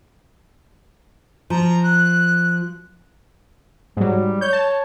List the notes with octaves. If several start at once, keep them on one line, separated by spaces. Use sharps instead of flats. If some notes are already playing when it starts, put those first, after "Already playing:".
F3 A#5
F#6
G#2 F#3 G3
C#5 G6
A5